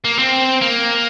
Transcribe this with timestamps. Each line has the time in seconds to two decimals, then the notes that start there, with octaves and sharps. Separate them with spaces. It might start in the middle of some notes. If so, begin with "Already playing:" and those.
0.05 A#3
0.18 C4
0.61 A#3